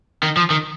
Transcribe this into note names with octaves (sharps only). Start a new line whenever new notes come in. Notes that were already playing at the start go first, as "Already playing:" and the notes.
D#3
F3
D#3